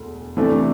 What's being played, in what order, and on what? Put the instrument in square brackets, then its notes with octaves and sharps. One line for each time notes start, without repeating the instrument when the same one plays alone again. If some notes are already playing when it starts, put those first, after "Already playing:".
Already playing: [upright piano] E1 D2
C3 E3 A3 D4 A4